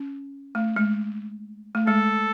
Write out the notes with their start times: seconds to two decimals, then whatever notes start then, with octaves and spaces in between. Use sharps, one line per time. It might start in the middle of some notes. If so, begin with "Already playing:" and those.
Already playing: C#4
0.55 A3
0.76 G#3
1.75 A3
1.87 G#3 A4